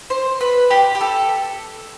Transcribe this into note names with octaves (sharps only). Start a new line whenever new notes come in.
C5
B4
G4
G4
A4